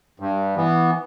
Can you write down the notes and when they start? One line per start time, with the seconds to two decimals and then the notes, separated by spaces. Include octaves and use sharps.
0.20 G2
0.56 E3 B3